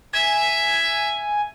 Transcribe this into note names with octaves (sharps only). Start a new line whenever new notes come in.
E5 G#5